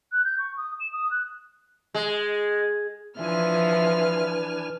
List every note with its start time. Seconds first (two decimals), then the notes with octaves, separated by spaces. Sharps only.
0.12 F#6
0.24 G6
0.38 C#6
0.57 D#6
0.79 E7
0.92 D#6
1.11 F#6
1.94 G#3
3.19 E3 F3 D4 B4 E5 G#5 F6